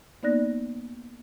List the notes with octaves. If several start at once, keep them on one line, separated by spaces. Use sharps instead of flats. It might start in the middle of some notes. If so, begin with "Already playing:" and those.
A#3 B3 D#4 D5 F#6 A#6